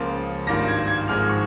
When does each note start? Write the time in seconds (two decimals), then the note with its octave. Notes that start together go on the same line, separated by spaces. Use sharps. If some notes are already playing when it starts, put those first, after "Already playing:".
Already playing: C#2 C#3 F3 A#3 F4 C6
0.47 G#1 G2 D#3 A#3 F4 A#6
0.68 G#6
0.87 G#6
1.08 G#1 G#2 F3 G#3 F6
1.29 C#6